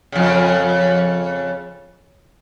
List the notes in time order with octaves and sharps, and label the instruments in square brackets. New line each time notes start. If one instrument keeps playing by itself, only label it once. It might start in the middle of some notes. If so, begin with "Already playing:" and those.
[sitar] F2 C#3